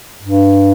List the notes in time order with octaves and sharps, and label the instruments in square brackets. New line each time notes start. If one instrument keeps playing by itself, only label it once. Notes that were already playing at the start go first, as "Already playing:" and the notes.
[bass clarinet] G2